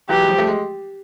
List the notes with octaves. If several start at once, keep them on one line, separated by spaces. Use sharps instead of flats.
E3 F#3 G4
G#3
F3 G3
A3
G#3